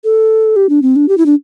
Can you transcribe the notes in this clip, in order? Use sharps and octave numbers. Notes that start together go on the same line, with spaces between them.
A4
G4
D4
C4
D4
G4
E4
D4